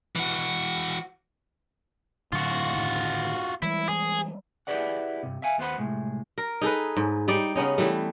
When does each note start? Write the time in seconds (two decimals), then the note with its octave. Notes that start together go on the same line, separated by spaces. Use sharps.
0.16 E3 F#4
2.32 A2 D3 F#3 F4 F#4
2.74 A2 D3 D#3
3.62 E3 G3 G#3 E4
3.89 G#4
4.67 E4 G4 G#4 B4 D5 F#5
5.23 G2 C3
5.42 E5 F5 G#5
5.58 D#2 B3 C5 F#5 B5
5.78 C2 A2 G#3
6.38 A#4
6.61 D#4 G#4 A4 B4
6.97 G#2
7.28 G3 D#4 D5
7.56 C#3 B3 C#4 D#4
7.78 E3 G3 A3